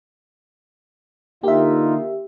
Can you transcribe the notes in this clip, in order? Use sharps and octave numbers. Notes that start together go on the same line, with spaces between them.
D3 A#3 D#4 F4 G4 E5